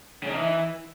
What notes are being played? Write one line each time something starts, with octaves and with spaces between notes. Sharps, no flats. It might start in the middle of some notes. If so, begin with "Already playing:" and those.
C#3
D#4
E3